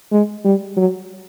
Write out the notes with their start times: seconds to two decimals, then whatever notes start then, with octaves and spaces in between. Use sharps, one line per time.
0.12 G#3
0.44 G3
0.77 F#3